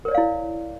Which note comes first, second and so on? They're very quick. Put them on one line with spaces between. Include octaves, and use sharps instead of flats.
A#4 C#5 D5 F5 E4